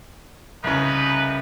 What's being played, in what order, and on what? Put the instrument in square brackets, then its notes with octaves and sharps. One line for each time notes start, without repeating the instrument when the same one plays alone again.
[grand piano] C2 C#3 [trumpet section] D#4 B4